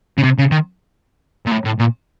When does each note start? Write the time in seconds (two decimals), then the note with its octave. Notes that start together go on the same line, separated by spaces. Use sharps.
0.18 C#3
0.23 C3
0.38 C#3
0.51 D#3
1.46 A#2
1.51 A2
1.65 A2
1.79 A#2